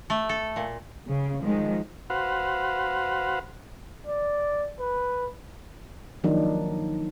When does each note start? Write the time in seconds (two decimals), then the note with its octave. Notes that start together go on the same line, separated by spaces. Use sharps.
0.10 A3
0.29 A4
0.56 A#2
1.07 C#3
1.42 D#3 F3 G#3
2.10 F#4 B4 C5 F5 F#5
4.06 D5
4.79 B4
6.24 D#3 F3 F#3 A#3 D4 D#4